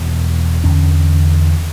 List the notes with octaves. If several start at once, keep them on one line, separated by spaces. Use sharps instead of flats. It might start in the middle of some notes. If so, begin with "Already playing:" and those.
Already playing: E2 B2
E2 D3 C#4